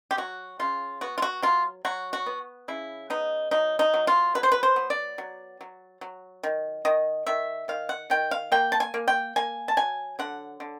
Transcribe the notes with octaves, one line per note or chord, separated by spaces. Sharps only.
G4
F#3 F#4
C#3 F4
B3 F#4
F4
F#4
F#3 F4
F#3 F#4
F#4
B3
C#3 E4
B3 D#4
F#3 D#4
D#4
F#3
F4
F#3 B4
C5
B4
C5
B3
D5
F#3
F#3
F#3
D#3
D#3 D#5
D#3 E5
D#3 F5
F#5
D#3 G5
F5
A#3 G5
A5
G#5
A#3
G5
A#3 G#5
A5
F#3 G#5
D3 F#5
D3